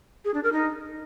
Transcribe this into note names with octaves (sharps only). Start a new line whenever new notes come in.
G#4
D4
A#4
D#4